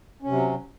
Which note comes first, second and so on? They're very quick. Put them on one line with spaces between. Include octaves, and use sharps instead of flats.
C#4 C3 F#3